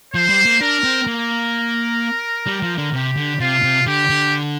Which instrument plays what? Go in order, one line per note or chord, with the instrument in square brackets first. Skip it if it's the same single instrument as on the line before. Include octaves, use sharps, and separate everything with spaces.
[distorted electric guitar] F3 [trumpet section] C5
[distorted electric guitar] G3
A#3
[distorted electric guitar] D4 [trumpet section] A#4
[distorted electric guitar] C4
[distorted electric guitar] A#3 [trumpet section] A#4
[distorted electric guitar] G3
F3
D3
[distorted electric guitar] C3 [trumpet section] G4
[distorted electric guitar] D3
[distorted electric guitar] C3 [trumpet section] F4
[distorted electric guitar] C3
[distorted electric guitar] D3 [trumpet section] G4
[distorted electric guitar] D3